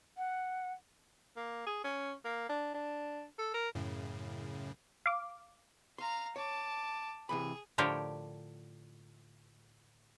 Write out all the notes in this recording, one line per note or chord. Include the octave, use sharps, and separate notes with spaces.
F#5
A#3
G#4
C#4
A#3
D4
D4
A4
A#4
F#2 A2 C#3
F5 D6
F5 A#5 C6
C#5 A5 D6
C3 E3 G#4 B5
A2 D3 F3 G4 A#4 C#5